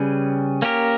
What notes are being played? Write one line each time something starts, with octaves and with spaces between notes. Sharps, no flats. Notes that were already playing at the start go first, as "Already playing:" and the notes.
Already playing: C#3 G3 C#4 G#4 B4
A#3 C#4 G4 A#4